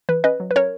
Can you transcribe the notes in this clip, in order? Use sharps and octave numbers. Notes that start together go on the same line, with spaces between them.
E3 B4
C#4 B4 D#5
F#3
B4
C#4 A#4 C#5